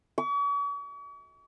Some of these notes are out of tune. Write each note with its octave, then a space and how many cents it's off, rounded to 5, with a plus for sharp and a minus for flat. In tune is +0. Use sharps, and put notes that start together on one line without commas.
C#6 +45